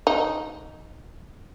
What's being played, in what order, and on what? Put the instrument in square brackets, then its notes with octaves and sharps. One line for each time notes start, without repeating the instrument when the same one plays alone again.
[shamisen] D#4